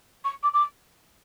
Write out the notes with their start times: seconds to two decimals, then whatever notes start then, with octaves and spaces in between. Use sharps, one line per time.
0.24 C#6
0.43 D6
0.53 D6